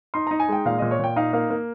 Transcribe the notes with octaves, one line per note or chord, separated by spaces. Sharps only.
D#4 C6
D#4 A#5
G#5
G#3 G5
A#2 F5
A#2 D#5
C#5
A#2 G5
D#4 F5
A#3 F5
A#3